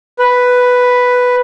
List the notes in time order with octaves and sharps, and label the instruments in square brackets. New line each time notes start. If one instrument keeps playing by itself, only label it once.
[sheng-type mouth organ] B4